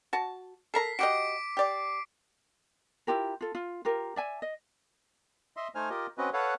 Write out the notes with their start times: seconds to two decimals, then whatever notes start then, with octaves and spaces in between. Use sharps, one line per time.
0.13 F#4 A5
0.74 A4 A#4 A#5 B6 C7
0.99 F#4 G4 D#5 D6 D7
1.57 G4 D5
3.07 E4 F4 G4 A#4
3.41 F4 A4
3.55 F4
3.85 F4 G4 A#4
4.16 D5 E5 G#5
4.42 D#5
5.57 D#5 E5 C6
5.75 A3 D#4 C5 G#5 F6
5.90 F4 G4 A#4 D#5
6.18 C4 C#4 F#4 B4 D#5
6.33 A4 B4 C#5 F5 F#5